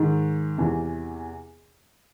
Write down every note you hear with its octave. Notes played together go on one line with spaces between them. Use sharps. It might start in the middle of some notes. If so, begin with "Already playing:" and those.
Already playing: G#2 D#3
E2 C3 E3